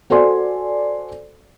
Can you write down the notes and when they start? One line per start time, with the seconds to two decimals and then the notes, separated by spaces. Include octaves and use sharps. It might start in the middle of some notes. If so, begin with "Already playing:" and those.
0.10 F#4 A4 C5 D5 G#5 C6